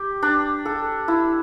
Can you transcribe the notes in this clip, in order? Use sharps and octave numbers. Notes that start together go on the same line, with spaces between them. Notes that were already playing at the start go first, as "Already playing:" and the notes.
Already playing: G4
D4
A4
E4